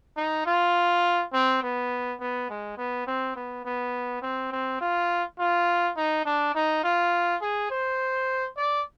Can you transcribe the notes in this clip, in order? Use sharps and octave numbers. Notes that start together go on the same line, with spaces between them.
D#4
F4
C4
B3
B3
G#3
B3
C4
B3
B3
C4
C4
F4
F4
D#4
D4
D#4
F4
G#4
C5
D5